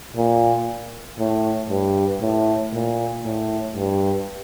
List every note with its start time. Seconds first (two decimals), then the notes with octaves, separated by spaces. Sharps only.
0.16 A#2
1.18 A2
1.69 G2
2.21 A2
2.73 A#2
3.24 A2
3.75 G2